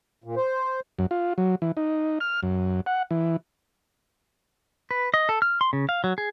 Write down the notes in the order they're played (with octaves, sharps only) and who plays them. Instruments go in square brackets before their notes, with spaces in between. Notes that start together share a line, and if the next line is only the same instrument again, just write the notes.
[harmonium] A#2
C5
[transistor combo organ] F#2
F4
F#3
E3
D#4
F6
F#2
F#5
E3
[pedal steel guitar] B4
D#5
A4
F6
C6
C#3
F5
F#3
G#4